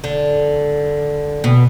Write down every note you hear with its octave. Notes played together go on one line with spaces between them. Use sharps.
D3
B2